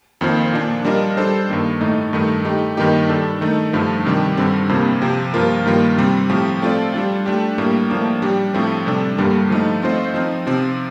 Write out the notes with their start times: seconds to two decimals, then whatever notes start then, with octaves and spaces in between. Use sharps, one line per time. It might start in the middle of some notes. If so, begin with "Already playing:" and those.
0.21 F2 D#3 A#3 F4 C5
0.53 A#2 F3 A#3 D4
0.85 G3 D4 F4 A#4 D#5
1.17 G3 D4 A4 C5
1.49 G2 D#3 A#3
1.81 A2 A3 D#4
2.13 G2 D#3 A3
2.45 A3 D#4 G4
2.77 G2 D#3 A#3 D#4 G4
3.09 G3 D4 A4
3.41 D#3 A3 D#4
3.73 G2 D3 F3 A3
4.05 C3 D#3 G3 D4 G4
4.37 G2 D3 G3 C4
4.69 F2 C3 F3 A#3
5.02 C3 F3 C4
5.34 G2 F3 A#3 F4 A#4
5.66 G2 D#3 G3 A#3 F4
5.98 C3 G3 C4
6.29 A2 F3 C4 G4
6.62 A3 C4 F4 A4 D5
6.94 G3 D4 F4
7.26 A3 D4 G4
7.58 A2 G3 A#3
7.90 A2 F3 A#3 D4
8.22 G3 D4 G4
8.54 A2 F3 A3 C4
8.86 C3 G3 D4 A4
9.18 G2 D3 G3 A#3
9.50 F3 A3 D#4
9.82 A3 C4 F4 C5 D#5
10.14 F3 C4 D#4
10.46 C3 F3 C4